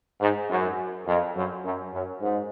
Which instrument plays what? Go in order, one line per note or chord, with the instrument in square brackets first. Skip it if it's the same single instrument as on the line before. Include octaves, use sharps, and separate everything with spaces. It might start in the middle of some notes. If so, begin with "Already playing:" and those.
[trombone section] G#2
F#2
F2
F#2
F#2
F#2
G#2